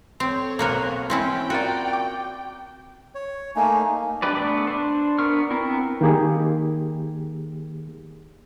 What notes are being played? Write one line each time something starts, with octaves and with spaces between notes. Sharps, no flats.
C4 A4 C5 C#5
B1 A#3 F#4 A#4 B4
E3 C4 C#4 E4 G5
F4 F#4 A#4 D5
D6
C#5
A3 A#3 D#4 G#5
D4 G4 B4 D5
A3 B3 D4 B4 D5
D4 C5
B3 D4 A#4 C#6 F6
B3 C4 E4 A#4
D#3 A#3 G4 G#4